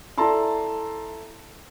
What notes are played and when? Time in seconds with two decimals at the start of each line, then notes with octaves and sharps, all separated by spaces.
0.18 E4 A4 D5 A5 A#5 C6